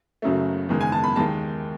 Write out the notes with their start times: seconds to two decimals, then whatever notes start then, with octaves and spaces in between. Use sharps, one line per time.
0.22 F#1 F#2 C#3 F#3 A3
0.69 F#1 E2 D#3 G#3
0.81 G#5
0.92 A5
1.04 B5
1.16 D#2 D#3 G#3 A5